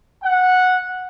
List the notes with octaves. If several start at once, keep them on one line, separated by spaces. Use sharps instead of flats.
F#5